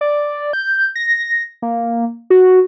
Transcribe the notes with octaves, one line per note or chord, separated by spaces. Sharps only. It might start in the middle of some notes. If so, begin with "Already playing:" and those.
D5
G6
A#6
A#3
F#4